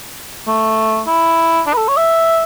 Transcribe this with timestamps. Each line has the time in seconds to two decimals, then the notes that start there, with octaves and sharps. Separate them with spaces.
0.47 A3
1.07 E4
1.67 D4
1.73 B4
1.77 A4
1.88 C#5
1.97 E5